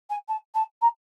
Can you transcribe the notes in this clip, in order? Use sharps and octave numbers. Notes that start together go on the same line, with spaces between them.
G#5
A5
A5
A#5